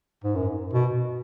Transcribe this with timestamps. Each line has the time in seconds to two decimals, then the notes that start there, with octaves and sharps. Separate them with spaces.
0.24 G#2
0.35 F#2
0.74 B2